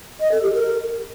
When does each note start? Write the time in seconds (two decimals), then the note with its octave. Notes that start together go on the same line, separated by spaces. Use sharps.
0.20 D#5
0.31 A4
0.43 G4
0.54 A#4